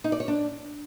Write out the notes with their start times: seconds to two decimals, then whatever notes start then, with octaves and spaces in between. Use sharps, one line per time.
0.04 D#4
0.12 D5
0.20 C#5
0.28 D4